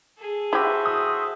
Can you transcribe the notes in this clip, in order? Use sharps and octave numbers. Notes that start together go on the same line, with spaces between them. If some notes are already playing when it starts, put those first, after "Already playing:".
G#4 A4
E4 F#4 G4 C5 E5
D#6